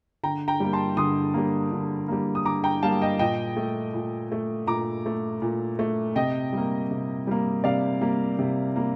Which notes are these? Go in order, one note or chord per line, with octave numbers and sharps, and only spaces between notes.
D3 G5 A#5
G5 A#5
G3 A#3
A5 C6
D3 C6 D#6
G3 A#3
D3
G3 A#3
D#6
D3 A#5 D6
G5 A#5
G3 A#3 F5 A5
D#5 G5
A#2 D#5 G5
A3
A#2
A3
A#2 A#5 D6
A3
A#2
A3
C3 D#5 G5
G3 A#3
C3
G3 A#3
C3 D5 F5
G3 A#3
C3
G3 A#3